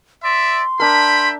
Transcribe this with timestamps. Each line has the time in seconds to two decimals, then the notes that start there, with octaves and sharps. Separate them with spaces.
0.24 D5 E5 C6
0.80 D4 A#4 E5 G5 B5